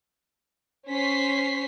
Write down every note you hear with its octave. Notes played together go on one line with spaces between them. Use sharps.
C#4 C5 B6 C7